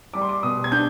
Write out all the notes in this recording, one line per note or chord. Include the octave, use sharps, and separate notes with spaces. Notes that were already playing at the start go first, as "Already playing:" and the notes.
G3 D6
C6
D6
B2 D#6
G#6
D4 G6